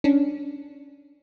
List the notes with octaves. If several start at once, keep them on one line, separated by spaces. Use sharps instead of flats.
C#4 D4